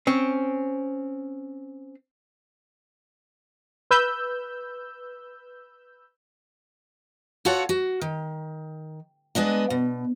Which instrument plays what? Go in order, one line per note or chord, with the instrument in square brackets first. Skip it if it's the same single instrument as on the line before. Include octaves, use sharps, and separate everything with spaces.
[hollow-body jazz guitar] C4 C#4
[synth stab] B4 E6 G6
[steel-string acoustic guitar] F4 F#4 A4 C#5 F#5
F#4
D#3
G#3 B3 D4 D#5
B2